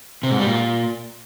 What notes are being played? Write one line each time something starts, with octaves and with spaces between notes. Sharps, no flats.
C3
G#2
G3
A#2